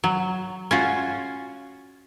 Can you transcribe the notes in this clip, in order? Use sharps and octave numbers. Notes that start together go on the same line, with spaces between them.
F#3
C#4 F4 F#4